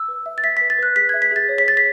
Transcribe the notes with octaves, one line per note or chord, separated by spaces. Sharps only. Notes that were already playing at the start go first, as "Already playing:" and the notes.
Already playing: E6
B4
E5
A6
E5 B6
B4 B6
A6
B4 F#6
G#4 B6
E5 G#6
B6
G#4 A6
C#5
B6
G#4 A6
B6